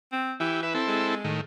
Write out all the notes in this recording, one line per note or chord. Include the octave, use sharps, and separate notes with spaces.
C4
E3 E4 G4
B4 E5
C4 E4 A4
G#3
A2 D#3